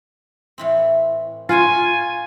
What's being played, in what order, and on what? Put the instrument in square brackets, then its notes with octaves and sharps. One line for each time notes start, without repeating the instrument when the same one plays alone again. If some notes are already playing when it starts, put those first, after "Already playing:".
[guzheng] A2 E3 C4
[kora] F4 [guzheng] F#4 B4 F#5 [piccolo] G#5